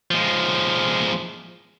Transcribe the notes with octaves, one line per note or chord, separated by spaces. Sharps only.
F3 G#3